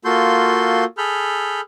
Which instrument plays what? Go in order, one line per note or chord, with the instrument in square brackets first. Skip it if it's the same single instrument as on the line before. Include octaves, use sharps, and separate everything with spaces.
[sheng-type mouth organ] A#3 F4 F#4 A4 C6 G6
G#4 A4 B5 F6 G6